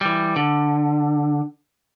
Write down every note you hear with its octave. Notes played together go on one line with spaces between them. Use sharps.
E3 G3
D3